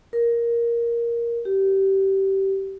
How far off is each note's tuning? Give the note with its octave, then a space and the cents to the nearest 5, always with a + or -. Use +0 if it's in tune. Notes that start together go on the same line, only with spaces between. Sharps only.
A#4 +5
G4 -20